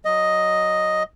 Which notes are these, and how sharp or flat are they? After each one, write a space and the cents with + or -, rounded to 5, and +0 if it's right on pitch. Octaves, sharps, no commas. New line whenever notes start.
F#3 +0 D#5 +0